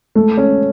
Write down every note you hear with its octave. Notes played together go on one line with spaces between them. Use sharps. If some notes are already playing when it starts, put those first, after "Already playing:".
A3
C#4